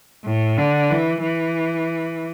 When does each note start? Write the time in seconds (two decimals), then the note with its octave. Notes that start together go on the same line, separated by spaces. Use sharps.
0.25 A2
0.57 D3
0.90 E3
1.23 E3